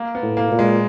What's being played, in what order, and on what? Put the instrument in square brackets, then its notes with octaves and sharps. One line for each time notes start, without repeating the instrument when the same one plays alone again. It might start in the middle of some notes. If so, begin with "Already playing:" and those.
Already playing: [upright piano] A#3
B3
[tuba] A2
[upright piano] A#3
[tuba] A#2
[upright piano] G#3